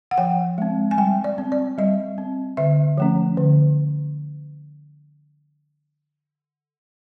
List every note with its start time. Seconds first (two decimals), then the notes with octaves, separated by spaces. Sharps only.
0.11 F#5
0.18 F3 G5
0.58 G#3 C4
0.91 G#5
0.98 G3 G5
1.24 D5
1.38 C4
1.52 D5
1.78 G3 D#5
2.18 C4
2.57 D3 E5
2.98 F3 A3 C#4
3.37 D3